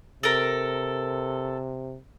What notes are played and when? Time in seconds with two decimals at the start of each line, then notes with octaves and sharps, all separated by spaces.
0.23 C3 A4 A#4